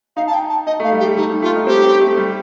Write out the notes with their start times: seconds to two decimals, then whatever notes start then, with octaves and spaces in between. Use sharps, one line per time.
0.17 D#4 F5
0.27 A5
0.34 G5
0.49 A5
0.67 D#4 D#5
0.80 A3 F5
0.92 G3
1.00 G4
1.04 G3
1.16 A3 D#4
1.30 G3
1.42 A3 F4
1.55 D#4
1.67 C4 G4
1.84 C4
2.01 A3
2.12 A3
2.17 G3